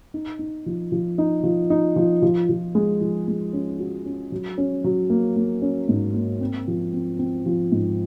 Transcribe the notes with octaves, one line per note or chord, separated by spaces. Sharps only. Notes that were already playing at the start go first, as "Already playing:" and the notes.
D#4
D#4
F3
F3
D#4
F3
D#4
F3
F3
F3
G#3
F3
G#3
C#4
F#4
C#4
F#3
C#4
F#3
A#3
A#3
C#4
G#2
A#3
C4
F3
C4
C4
F3
G#2